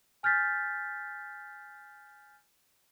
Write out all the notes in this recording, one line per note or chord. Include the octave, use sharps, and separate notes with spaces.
G#5 F6 G6 A6 B6